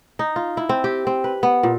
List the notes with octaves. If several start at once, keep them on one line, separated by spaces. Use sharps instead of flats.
D#4
F4
E4
C4
G4
C4
B4
B3
A#2